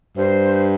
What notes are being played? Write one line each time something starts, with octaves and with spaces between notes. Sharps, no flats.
G2 C5